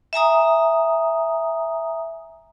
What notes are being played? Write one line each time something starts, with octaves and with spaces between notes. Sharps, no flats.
E5 G#5 A#5 D#6